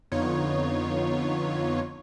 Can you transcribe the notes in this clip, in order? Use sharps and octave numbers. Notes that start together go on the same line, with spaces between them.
F2 D3 B3 D#4 F4 C#5